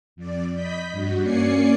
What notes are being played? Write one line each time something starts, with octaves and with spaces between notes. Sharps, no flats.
F2 D5
D#5 B5 G6 B6
G2 F#4
A#3 C#4 D5 G#5 C7 C#7